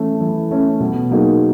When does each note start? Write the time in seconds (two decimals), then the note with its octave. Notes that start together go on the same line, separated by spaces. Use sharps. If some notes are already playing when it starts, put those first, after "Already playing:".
Already playing: E3 A3 C#4
0.21 E3
0.51 A3 C#4
0.80 B2
1.11 F#3 A#3 D#4 G#4